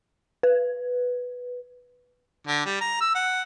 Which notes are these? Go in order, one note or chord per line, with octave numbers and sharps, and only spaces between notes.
B4
D3
G3
A#5
E6
F#5